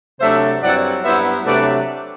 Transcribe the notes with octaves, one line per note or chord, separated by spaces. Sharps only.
C3 F#3 A3 D4 C5 E5
G2 F#3 C4 E4 D5 F#5
G2 F#3 B3 E4 C5 E5
C3 F#3 A3 D4 B4 D5